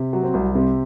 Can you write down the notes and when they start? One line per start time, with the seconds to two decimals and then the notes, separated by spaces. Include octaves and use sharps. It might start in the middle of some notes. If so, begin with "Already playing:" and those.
Already playing: C3
0.13 F#3
0.23 C4
0.34 C2
0.55 C3 C4